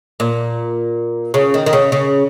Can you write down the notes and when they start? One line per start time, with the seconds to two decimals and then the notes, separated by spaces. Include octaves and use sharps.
0.20 A#2
1.34 C#3
1.54 D#3
1.66 D#3
1.73 C#3
1.92 C#3